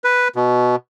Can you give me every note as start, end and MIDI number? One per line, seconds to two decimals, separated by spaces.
0.04 0.28 71
0.36 0.76 47